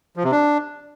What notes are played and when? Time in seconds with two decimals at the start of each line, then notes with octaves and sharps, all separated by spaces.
0.16 F3
0.24 C3
0.32 D4